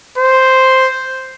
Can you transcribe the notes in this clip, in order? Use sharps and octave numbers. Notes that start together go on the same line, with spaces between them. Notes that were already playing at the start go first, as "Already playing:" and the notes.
C5